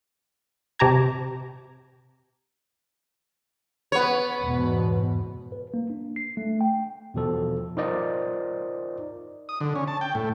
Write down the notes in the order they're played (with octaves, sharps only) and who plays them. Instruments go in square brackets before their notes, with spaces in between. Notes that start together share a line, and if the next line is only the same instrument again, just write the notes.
[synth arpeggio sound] C3 G4 A5 A#5 G#6
[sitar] B3 C#5
[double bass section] E2 G#2 B2
[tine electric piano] B4
A#3
D4
C7
A3
G5
E2 B2 F3 A4
D#4 F4 A#4 C5 D5 D#5
[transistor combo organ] D#6
D3
C#4
A5
G5
A2